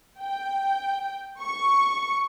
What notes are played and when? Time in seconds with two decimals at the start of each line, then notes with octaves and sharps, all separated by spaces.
0.19 G5
1.41 C#6